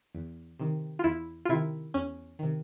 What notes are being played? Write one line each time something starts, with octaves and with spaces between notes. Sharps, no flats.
E2
C3 D#3
F4
E2 E4
F4
C3 D#3 E4
E2 C#4
C3 D#3